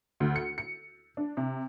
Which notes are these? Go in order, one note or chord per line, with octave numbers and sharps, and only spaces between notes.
D2
C#7
C#7
D4
C3